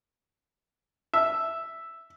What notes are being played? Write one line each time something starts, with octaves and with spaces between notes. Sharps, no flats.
E5